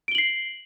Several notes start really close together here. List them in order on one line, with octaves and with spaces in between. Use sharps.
D7 G7 F#7 C7